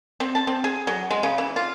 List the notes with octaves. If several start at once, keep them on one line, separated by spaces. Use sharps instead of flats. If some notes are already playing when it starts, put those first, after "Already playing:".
C4
A5
C4
G#4
F#3
G#3
C#3
E3
F4